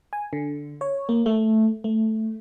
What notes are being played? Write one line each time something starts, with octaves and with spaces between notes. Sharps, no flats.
G#5
D3
C#5
A#3
A3
A3